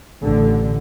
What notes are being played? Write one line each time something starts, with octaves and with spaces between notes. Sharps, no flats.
A1 D3